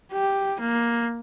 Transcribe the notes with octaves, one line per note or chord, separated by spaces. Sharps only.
G4
A#3